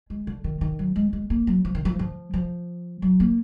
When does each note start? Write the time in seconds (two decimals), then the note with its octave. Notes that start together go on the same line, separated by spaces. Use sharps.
0.10 G#3
0.27 D3
0.44 D#3
0.61 D#3
0.79 F#3
0.96 G#3
1.13 G#3
1.30 A#3
1.47 F#3
1.65 F3
1.75 D#3
1.85 F3
1.99 F3
2.34 F3
3.02 F#3
3.20 A#3